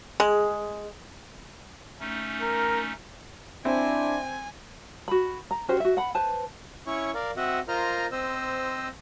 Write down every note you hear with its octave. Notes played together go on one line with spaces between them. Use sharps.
G#3 G#4
A3 C#4 D#4
A#4
C4 D4 E4 G#5
F#4 B5
A#5
C#4 F#4 G4 C5
F#4 E5
F#5 B5
B4 C5 A5
C#4 E4 C#5 C#6
A#4 D5 F5
C4 F#4 D#5 E5 F#5
F4 A#4 C5 D#5 A#5 F6
C4 C5 D#5 E6